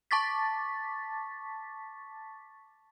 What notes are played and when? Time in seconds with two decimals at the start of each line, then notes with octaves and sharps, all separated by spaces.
0.11 A5 C#6 D6 A6 B6